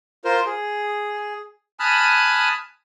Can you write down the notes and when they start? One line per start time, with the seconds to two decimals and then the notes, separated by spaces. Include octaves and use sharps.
0.25 F4 A#4 C5
0.46 G#4
1.80 G#5 A5 B5 D#6 F6 F#6